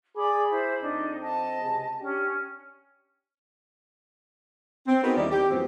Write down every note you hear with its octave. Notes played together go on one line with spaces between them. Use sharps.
G#4 D5 B5 D6
E4 C5 B5
F2 C4 D4 D#4
D#5 A5
C#2 C3 G#4
C#4 D4 G4
C4
B3 C4 D#4 F#4 G#4 A#4
D#2 D#3 G3 D#4 E4 D5
G4
F#2 A2 F3 B3 C4